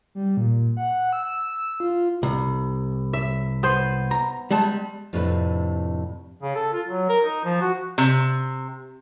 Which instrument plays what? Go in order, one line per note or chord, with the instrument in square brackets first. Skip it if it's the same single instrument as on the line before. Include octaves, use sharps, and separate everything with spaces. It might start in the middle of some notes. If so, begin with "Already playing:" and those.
[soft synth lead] G3
A#2
F#5
E6
F4
[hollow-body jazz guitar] C2
[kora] E5
B3 C5
[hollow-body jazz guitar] A#5
G3 G#3 A5
[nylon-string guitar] F2 A2 C3 D4 F#4 B4
[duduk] C#3
A4
F4
F#3
A#4
D#4
F3
F#4
[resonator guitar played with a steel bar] C3